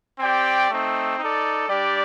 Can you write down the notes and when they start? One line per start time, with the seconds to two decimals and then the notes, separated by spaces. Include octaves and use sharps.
0.19 C4 G4 D5 G5
0.69 A3 C4 D#4
1.19 D#4 A4 D5
1.68 G3 D4 G4 D5